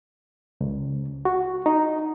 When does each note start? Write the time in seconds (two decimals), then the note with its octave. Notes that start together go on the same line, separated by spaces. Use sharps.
0.61 C#2
1.25 F#4
1.66 D#4